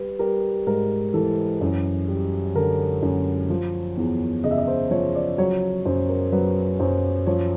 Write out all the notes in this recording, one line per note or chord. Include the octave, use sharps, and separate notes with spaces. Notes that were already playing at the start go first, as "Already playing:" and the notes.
Already playing: G3 B4
G3 A#4
G#2 A#4
E3 A4
F#2
G3
D3 A#4
F#2
F3
E2
C#3 D#5
E5
D#5
C5
F3 C#5
D5
F#3 C#5
F#2 C5
A#4
F#3 B4
F#2 C5
F3 C#5